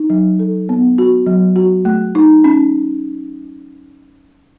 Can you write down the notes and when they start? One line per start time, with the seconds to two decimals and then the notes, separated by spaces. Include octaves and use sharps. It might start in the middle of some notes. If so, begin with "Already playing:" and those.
Already playing: D#4
0.10 F#3
0.39 A4
0.69 B3
0.98 F#4
1.27 F#3
1.56 F#4
1.85 A3
2.15 D#4
2.44 C#4